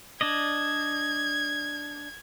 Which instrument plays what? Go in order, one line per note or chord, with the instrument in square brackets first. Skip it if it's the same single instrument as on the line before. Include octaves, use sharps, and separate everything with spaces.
[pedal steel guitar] D4 D5 D#5 [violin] G#6